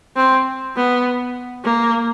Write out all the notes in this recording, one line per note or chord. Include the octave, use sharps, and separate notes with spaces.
C4
B3
A#3